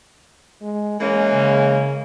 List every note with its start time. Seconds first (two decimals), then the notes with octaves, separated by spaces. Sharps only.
0.62 G#3
1.01 E3 G#3 A#3 C#4
1.33 C#3